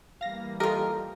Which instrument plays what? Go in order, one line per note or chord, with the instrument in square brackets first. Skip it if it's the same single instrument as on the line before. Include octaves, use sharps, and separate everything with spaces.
[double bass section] E3 G3 A#3 [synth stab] F5 A#6
[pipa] F4 A#4 [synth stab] G4 D#5 [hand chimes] A4